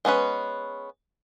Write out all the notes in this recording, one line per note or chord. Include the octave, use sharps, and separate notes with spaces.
G#3 B3 C#4 B4